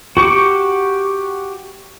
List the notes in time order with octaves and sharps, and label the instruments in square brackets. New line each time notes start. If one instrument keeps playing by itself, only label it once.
[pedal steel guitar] F#4 G4 C#6 D6